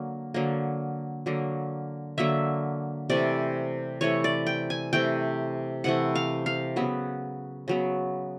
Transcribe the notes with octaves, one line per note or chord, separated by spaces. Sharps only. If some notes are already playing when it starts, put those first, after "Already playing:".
Already playing: D3 F#3 A#3
D3 F#3 A#3
D3 F#3 A#3
D3 F#3 A#3 E5
C3 E3 A3 D5
C3 E3 A3 C#5
D5
G5
G#5
C3 E3 A3 G5
C3 E3 A3 F#5
F5
F5
C#3 F#3 B3
C#3 F#3 B3